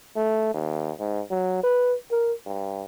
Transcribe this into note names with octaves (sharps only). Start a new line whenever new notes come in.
A3
D#2
G#2
F#3
B4
A#4
G2